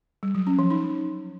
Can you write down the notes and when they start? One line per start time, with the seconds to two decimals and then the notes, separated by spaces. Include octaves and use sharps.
0.23 G3
0.35 F#3
0.47 C#4
0.59 F3
0.71 D#4